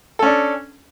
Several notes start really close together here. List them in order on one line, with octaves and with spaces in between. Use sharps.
A4 C#4 D4